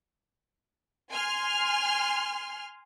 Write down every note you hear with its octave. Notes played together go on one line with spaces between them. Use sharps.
G#5 C6 F6